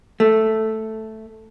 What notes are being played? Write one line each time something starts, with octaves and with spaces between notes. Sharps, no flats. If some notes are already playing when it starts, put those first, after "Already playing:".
A3